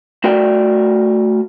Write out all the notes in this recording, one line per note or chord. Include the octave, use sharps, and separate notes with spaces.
A3 F#4 A#4 D5 G5